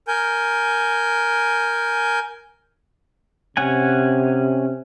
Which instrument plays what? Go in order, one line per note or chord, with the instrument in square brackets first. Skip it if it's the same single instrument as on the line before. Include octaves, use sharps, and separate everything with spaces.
[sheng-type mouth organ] A#4 G#5 G6
[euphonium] C3 [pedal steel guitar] C#4 F#5 G#5